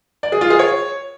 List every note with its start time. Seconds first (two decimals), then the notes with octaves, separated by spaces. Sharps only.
0.23 D5
0.32 G#4
0.41 F4
0.50 G#4
0.59 C#5